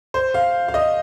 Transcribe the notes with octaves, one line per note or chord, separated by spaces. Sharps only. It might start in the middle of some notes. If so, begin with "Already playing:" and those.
C5
F5
F5
D#5